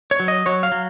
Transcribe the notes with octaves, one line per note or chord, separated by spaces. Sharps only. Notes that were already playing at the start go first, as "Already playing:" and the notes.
C#5
F#3
D#5
F#3 C#5
F5
F#3